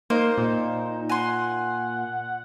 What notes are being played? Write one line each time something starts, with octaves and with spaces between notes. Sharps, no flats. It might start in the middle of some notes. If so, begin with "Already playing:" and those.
A#3 D#4 C5
A#2
F#5 G#5 C6